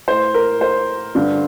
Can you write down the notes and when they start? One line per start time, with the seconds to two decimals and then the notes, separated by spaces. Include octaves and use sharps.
0.08 A2 C5
0.34 A#4
0.61 C5
1.15 G2 D3